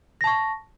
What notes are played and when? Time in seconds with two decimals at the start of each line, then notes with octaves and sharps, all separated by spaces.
0.21 A#6
0.24 A5
0.27 C#6